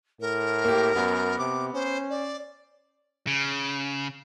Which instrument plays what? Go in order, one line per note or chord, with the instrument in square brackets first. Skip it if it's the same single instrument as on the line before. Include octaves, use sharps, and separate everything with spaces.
[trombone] A2 [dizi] A#4
[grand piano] A#3 G4
[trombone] F#2 [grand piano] B3
[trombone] C3 [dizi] D6
[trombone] C#4 [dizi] C5
[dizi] D5
[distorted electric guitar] C#3